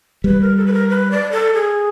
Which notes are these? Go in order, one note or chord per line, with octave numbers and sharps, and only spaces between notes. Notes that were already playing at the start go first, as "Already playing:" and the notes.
G3 B4
A#4
A4
B4
A#4
B4
D5
A4
G#4